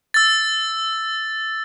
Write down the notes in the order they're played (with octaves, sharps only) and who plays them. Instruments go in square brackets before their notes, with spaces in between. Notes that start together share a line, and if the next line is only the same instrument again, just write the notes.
[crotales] E6 A6